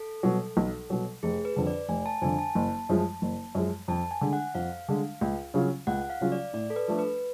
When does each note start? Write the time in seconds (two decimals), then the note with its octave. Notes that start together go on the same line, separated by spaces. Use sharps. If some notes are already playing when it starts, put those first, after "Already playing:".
Already playing: A4
0.23 B2 F#3
0.57 B1
0.90 B2 F#3
1.23 F1 G#4
1.45 B4
1.56 F2 D3
1.67 D5
1.88 F1 G#5
2.06 A5
2.22 F2 D3 G#5
2.39 A5
2.55 F#1
2.89 F#2 F3 G#3
3.22 F#1
3.55 F#2 F3 G#3
3.88 F2 A5
4.11 G#5
4.21 D3 G#3
4.33 F#5
4.55 F2 F5
4.89 D3 G#3
5.21 C#2
5.54 C#3 F#3 C#4 F4
5.87 C#2 F#5
6.10 F5
6.21 C#3 F#3 C#4 F4
6.32 D5
6.53 A2 D5
6.70 A4
6.76 B4
6.88 F3 A3 D4
6.99 B4